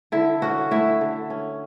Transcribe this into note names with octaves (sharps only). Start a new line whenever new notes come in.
D3 E4
C#4 F#4
A3 E4
D3
C#4